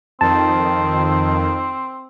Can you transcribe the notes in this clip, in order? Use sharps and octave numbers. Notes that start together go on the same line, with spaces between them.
F2 D#3 C4 A5